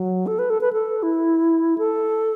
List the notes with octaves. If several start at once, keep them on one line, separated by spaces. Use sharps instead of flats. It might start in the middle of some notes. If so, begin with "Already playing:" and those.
Already playing: F#3
A4
B4
A4
B4
A4
E4
A4